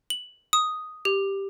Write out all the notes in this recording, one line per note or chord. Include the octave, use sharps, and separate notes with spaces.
F#7
D#6
G4